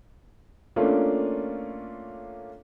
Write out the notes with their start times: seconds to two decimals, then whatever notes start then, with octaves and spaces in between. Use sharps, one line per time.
0.76 A3 A#3 C#4 D4 F4